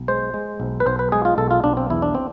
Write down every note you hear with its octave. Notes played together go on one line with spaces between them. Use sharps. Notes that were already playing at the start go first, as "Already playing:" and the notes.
Already playing: B1
G#3 C5
G#3
B1
B4
B1 C5
B4
G#3 G#4
F4
B1 A4
F4
B1 D4
C4
E2 E4
D4
C4